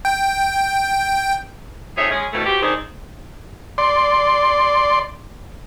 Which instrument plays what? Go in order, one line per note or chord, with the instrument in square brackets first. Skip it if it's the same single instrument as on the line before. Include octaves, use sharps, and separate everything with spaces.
[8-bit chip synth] G5
[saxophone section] F2 D#4 G#4 C#5 E5
G#3 C#4 G#4
F2 B2 E3 A3
B2 B3 C4 G4
D#3 C4 D4 D#4 G#4
[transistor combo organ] D5 C6